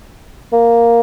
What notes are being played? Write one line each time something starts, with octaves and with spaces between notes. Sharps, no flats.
A#3